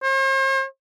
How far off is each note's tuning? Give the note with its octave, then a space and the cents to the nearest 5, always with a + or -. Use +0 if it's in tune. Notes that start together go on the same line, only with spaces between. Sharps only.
C5 +45